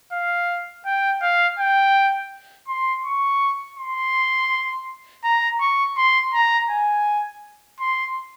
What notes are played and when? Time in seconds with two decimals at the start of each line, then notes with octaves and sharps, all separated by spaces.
0.13 F5
0.86 G5
1.22 F5
1.59 G5
2.68 C6
3.05 C#6
3.78 C6
5.24 A#5
5.61 C#6
5.97 C6
6.34 A#5
6.70 G#5
7.80 C6